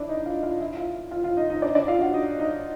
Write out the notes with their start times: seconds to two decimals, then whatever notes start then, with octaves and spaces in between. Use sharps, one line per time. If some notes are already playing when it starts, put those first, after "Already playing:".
Already playing: D4 E4 D5 E5
0.09 D#4 D#5
0.26 F4 F5
0.43 F4 F5
0.60 E4 E5
0.77 F4 F5
1.11 F4 F5
1.24 F4 F5
1.37 D#4 D#5
1.50 D#4 D#5
1.62 D4 D5
1.75 D4 D5
1.88 F4 F5
2.01 F#4 F#5
2.14 D#4 D#5
2.39 D#4 D#5